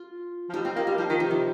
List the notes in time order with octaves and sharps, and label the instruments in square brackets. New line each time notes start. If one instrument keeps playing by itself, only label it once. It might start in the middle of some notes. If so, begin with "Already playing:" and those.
Already playing: [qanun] F4
[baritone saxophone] F3
[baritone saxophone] G3 [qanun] D#4
[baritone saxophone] C4 [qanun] F4
[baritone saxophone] A#3 [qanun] G4
[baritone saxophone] G3 [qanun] F4
[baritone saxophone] F3 [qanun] F4
[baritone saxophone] D#3 [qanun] D#4
[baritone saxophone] C3 [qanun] F3
[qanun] G3